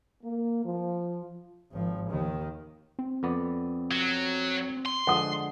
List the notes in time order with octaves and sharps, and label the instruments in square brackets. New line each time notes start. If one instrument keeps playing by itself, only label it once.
[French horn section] A#3
F3
[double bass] G#1 F3
D#2 D#3
[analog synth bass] C4
[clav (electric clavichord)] F2 B3 D5
[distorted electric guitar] F#3
C6
[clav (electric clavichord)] D3 F3 G#3 [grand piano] F#5 D#6